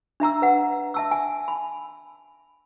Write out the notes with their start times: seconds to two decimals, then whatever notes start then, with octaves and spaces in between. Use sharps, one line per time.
0.20 D4 E5 A#5 E6
0.42 B4 F#5
0.94 E5 A5 E6
1.11 G#5
1.48 B5